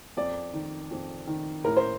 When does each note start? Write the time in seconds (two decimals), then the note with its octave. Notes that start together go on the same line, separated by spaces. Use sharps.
0.17 F2 D5
0.53 D#3
0.91 F2
1.27 D#3
1.64 A2 A#4
1.77 C5